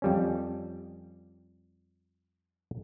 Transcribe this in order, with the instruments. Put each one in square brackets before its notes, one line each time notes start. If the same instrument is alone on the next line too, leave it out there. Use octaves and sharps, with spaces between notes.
[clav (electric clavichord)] F2 G3 C#4